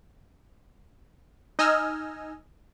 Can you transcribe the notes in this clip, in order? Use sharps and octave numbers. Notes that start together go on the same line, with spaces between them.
D#4 D#5 G#5 E6 F6